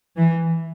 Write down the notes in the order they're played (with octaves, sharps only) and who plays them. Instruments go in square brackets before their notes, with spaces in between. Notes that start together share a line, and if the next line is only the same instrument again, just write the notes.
[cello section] E3